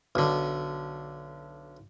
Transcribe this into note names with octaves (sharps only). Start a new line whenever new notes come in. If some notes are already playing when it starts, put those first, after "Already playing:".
B1 D3